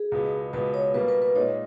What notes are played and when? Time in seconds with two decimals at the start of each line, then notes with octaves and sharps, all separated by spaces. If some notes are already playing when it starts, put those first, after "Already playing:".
Already playing: G#4
0.12 C#2 B2 G#3 B3
0.53 C#2 B2 G#3 B3 B4
0.74 C#5
0.94 B2 G3 A#3 B4
1.08 B4
1.22 B4
1.35 A#2 G#3 D#4 C#5